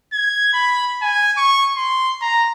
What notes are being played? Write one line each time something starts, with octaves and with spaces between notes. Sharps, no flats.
G#6
B5
G#5
C#6
C6
A#5